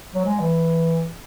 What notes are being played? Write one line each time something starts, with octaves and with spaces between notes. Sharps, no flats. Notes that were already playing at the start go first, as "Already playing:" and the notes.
F#3
G#3
E3